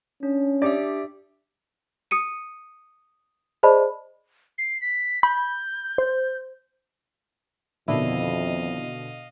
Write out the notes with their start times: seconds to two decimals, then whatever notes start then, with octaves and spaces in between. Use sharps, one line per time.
0.23 C#4 D4
0.62 D4 G4 D5 E5
2.11 D#6 C#7 D#7
3.63 G#4 C5 D5 D#5 A5 B5
4.58 C7
4.82 B6
5.23 B5 G6
5.98 C5
7.88 F2 B2 D3 D#3 D4 E4 D#5 F5